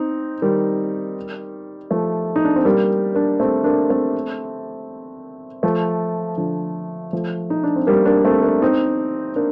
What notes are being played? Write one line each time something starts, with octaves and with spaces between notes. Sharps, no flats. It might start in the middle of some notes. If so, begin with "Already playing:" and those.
Already playing: C4 D#4
D#3 G3
F3 A3
D#4
D4
C4
G3 A#3
A#3 D4
A3 C4
A#3 D4
A3 C4
F3 A3
D3 F3
F3 A3
D#4
D4
C4
G3 A#3
A#3 D4
A3 C4
A#3 D4
C4 D#4
A#3 D4